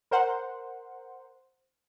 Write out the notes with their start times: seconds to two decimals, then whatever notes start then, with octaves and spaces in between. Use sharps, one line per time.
0.11 A#4 C5 F#5 C6